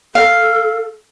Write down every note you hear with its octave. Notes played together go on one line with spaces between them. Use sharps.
A4 F5